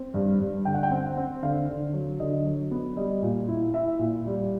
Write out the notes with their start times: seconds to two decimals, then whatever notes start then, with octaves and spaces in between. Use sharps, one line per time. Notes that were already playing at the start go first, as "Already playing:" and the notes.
Already playing: C4
0.14 G2
0.40 G2
0.65 D3 G5
0.74 F#5
0.83 G5
0.91 C4
1.04 F#5
1.17 C4
1.43 D3 F5
1.68 D3
1.94 F#3
2.20 D3 D#5
2.45 F#3
2.71 B3
2.96 G3 D#5
3.22 A#2
3.48 E4
3.74 E4 E5
3.99 A#2
4.26 G3